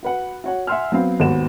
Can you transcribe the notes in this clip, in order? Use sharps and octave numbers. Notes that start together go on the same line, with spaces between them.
F#4 B4 F#5
F#4 C#5 F#5
E5 F#5 G#5 C6 E6 F6
F#3 B3 C4 F5
D#2 G#2 B3 F#4 E7